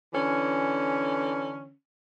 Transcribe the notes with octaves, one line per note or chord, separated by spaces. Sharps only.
D3 E3 C#4